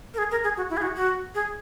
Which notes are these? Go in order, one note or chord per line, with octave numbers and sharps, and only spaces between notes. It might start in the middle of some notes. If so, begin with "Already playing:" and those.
A#4
G#4
A#4
G#4
F#4
E4
G#4
F#4
F#4
G#4